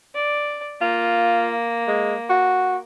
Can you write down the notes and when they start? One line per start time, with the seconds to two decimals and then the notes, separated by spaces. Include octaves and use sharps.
0.15 D5
0.81 A#3 F4
1.88 G#3
2.29 F#4